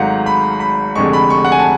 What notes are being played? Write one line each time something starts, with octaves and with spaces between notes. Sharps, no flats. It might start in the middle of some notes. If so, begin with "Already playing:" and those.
Already playing: G#1 G#2 F#3 A3 F5 F#5
B5
B5
F1 F2 D3 G#3 C#6
B5
C#6
F#5
G#5
A5